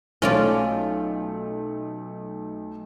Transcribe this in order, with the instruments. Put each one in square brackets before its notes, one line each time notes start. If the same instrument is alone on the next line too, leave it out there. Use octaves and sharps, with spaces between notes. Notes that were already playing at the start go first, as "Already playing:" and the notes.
[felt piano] B1 A3 [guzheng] C#4 F4 D5